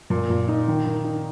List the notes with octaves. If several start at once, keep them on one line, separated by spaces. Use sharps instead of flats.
A#2
A#2
D#4
D#3
D#3
D#4